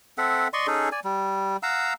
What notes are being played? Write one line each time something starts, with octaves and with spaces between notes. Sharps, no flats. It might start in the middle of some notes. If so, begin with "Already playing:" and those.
C4 A4 E5 F#5
D5 D#5 C6 C#6
C#4 D#4 G#4 A4
D5 G#5
G3
F5 F#5 A#5 E6